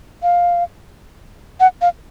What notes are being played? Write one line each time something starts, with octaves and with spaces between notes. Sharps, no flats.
F5
F#5
F5